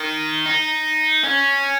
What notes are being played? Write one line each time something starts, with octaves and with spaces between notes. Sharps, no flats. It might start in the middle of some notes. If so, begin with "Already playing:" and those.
Already playing: D#3
D#4
C#4